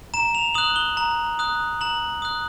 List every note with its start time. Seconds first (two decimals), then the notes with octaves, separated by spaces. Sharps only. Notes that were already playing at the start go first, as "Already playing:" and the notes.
0.14 A#5 E7
0.35 F7
0.54 D#6 F#6 F#7
0.76 G7
0.97 A#5
1.39 D#6 F#6
1.81 A#5 F#7
2.22 D#6 F#6